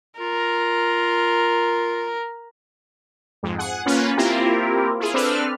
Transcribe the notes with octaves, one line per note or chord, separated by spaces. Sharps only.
F4 A#4
F2 G#2
G#4 F#5
A#3 C#4 F4 B4
A#3 C4 E4 F4 G4 A#4
E4 F4 G#4
C4 D4 A4 B4 F6